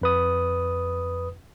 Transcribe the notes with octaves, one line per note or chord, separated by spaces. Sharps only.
F2 B4 D#6